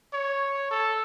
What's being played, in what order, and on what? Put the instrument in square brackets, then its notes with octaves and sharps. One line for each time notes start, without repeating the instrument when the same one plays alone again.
[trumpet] C#5
A4